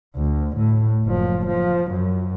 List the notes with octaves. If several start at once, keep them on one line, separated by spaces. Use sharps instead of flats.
D2
A2
F#1 F3
F3
F#2